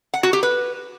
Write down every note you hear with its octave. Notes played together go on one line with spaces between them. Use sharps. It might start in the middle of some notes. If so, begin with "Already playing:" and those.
F#5
F#4
G4
B4